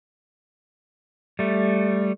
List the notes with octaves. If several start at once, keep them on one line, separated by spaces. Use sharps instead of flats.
G3 A3